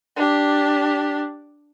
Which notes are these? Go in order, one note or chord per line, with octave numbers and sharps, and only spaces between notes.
D4 G4